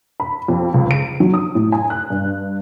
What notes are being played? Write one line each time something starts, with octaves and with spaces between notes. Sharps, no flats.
B5
F2
C#2
D7
F#3
D#6
A2
G#5
F#6
G2